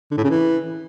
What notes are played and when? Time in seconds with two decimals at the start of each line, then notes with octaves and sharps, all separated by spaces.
0.11 D3
0.17 A2
0.24 C#3
0.30 E3